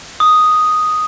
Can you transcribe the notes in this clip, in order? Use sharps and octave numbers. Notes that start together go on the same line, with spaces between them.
D#6